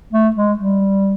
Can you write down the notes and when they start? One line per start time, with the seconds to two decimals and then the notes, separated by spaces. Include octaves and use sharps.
0.13 A3
0.36 G#3
0.59 G3